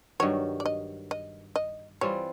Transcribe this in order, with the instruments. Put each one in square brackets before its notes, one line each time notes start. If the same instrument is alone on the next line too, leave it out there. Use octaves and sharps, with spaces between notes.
[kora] G2 D#3 F#3 [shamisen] C#5
[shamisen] D5
D#5
D#5
D#5
[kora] E3 G3 C4 F4 [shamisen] C#5